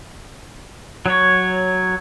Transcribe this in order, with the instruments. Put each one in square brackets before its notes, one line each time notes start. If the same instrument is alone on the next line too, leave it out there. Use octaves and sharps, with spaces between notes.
[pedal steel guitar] F#3 C#5